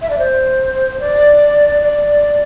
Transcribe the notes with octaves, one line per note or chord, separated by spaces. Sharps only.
E5
D5
C5
D5
D5